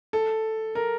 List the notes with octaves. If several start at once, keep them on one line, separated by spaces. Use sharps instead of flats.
A4
A#4